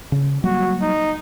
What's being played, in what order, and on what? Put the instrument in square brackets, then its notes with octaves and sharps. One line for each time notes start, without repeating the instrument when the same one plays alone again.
[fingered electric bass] C#3
[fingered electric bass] F#3 G3 A#3 [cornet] F#4
[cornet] D#4